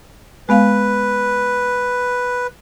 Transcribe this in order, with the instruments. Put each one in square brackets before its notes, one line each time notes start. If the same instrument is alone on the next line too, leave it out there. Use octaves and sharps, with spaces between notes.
[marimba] G#3 B3 F5 [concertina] B4